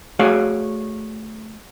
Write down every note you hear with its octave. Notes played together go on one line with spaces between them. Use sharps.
A3 F#4 G#4 C#5 D5 F5